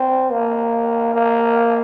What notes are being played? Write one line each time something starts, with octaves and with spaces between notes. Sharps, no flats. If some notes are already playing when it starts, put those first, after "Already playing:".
Already playing: C4
A#3
A#3